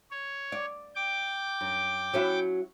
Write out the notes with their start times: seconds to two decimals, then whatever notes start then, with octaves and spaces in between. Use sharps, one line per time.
0.11 C#5
0.52 D5
0.95 G5 D6
1.61 F#2
2.14 F#3 C#4 E4